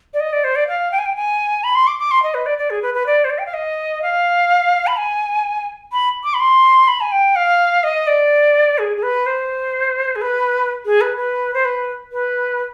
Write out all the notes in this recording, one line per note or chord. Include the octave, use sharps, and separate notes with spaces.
D5
D#5
D5
C5
D5
F5
G5
G#5
G5
G#5
B5
C6
D6
D6
C6
D#5
B4
D5
D5
G#4
B4
B4
D5
C5
D5
G5
F5
D#5
F5
B5
G#5
B5
D6
B5
C6
B5
G#5
G5
F5
D#5
D5
G#4
G#4
B4
C5
G#4
B4
G#4
B4
B4
C5
B4
B4